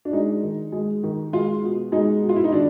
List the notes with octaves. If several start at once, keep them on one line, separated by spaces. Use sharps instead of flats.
D4
G#3 D#4
D#3
G#3
D#3
G#3 F4
B2
G#3 D#4
B2
F4
E4
D#4
D#3 D4